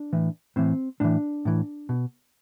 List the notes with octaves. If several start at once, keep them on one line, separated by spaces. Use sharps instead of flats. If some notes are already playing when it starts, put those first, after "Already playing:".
Already playing: D4
A2 E3
A2 E3 C4
A2 E3 D4
A2 E3
B2